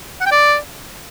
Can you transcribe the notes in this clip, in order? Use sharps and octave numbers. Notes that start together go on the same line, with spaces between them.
F#5
G5
D5